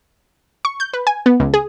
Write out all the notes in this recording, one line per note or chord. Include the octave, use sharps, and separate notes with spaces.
C#6
G6
B4
G#5
B3
C#2
G#4